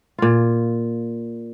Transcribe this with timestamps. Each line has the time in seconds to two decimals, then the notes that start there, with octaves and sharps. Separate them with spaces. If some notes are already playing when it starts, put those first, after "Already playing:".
0.19 A#2 F4